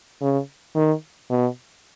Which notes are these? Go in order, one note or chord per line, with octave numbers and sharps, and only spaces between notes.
C#3
D#3
B2